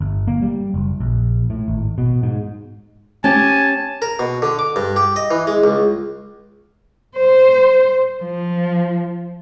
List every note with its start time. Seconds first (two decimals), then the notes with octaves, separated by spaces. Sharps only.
0.01 G1
0.27 A#3
0.42 G3
0.74 F#1
1.00 A#1
1.50 A2
1.68 G#1
1.98 B2
2.23 G#2
3.24 C#4 G4 G#5 A5
4.02 A#4
4.19 B2
4.42 D3
4.59 D6
4.76 G2
4.96 G4
5.16 D#5
5.31 E3
5.47 G#3
5.64 C#2
7.17 C5
8.23 F3